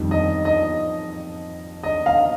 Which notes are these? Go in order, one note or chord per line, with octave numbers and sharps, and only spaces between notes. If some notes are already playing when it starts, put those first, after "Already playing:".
Already playing: F2 D#3 G3
D#5
D#5
D#5
F5